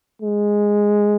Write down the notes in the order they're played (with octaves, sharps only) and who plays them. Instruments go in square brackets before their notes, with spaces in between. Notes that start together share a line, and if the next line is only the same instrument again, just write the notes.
[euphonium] G#3